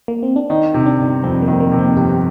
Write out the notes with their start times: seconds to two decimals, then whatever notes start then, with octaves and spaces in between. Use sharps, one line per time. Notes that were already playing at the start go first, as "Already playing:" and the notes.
0.08 A#3
0.23 C4
0.36 D4
0.50 D#3 D#4
0.74 C3
0.86 D4
0.99 G1
1.23 F2 C4
1.42 A#3
1.48 D#3
1.60 A#3
1.72 C3
1.79 C4
1.96 G1 G4